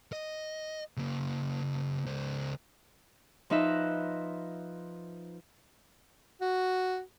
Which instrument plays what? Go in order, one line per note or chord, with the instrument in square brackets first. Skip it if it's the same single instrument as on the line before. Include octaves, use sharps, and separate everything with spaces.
[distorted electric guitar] D#5
C#3 A#3
C#2 C5
[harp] F3 D#4 B4 E5
[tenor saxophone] F#4